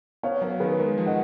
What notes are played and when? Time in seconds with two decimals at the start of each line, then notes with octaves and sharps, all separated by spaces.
0.23 B3 C#5 F5
0.41 F#3 A#4 C#5
0.60 D#3 G#4 B4
0.78 G#3 A#4
0.98 F3
1.06 D#5 F#5